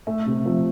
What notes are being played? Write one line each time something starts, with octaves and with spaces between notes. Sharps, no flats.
A3 E5
C3
F3